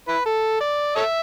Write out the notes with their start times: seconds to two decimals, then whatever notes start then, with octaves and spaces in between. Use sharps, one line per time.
0.08 E4 B4
0.26 A4
0.61 D5
0.96 A4 C#5 E5